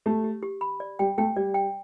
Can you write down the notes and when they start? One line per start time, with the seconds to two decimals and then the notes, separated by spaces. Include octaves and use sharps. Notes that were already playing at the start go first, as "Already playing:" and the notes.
0.06 A3 G4
0.24 G4
0.42 G4
0.61 B5
0.80 D5
0.99 G3 G5
1.18 A3 G5
1.36 G3 D5
1.54 G5